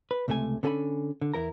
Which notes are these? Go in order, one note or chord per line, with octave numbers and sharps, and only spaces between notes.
B4
C#2 C3 A3 G4 G#5
D3 C#4 A4 E5 G#5 B5
D3
E2 E4 A#4 A#5